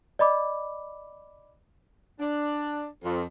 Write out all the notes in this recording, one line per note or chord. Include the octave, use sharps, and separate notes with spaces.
D5 D#5 B5 D6
D4
F2